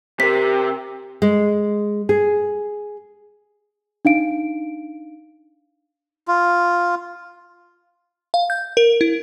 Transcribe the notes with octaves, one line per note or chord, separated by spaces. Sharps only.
C3 G4 A#4 C5 B6
G#3
G#4
D4 D#4 F5 D7
F4
F5
G6
A#4
E4